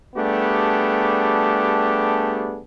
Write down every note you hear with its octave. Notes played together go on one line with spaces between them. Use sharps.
G3 A3 B3 D4 G4 G#4